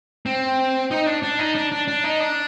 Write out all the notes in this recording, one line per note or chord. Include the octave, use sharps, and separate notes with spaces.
C4
D#4
D4
D4
D#4
D4
D4
D4
D#4
D4